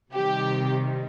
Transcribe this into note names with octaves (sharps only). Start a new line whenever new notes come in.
C3 D#3 G3 G4